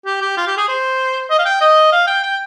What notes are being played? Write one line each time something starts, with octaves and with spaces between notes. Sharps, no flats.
G4
G4
F4
G4
G#4
C5
D#5
F5
G5
D#5
F5
G5
G5